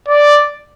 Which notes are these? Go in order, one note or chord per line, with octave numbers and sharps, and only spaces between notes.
D5